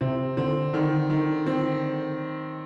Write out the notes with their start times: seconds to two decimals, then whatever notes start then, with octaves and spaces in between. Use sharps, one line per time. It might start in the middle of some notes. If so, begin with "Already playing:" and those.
0.01 C3 C4
0.37 D3 C4
0.73 D3 D#3
1.10 D#3
1.46 C4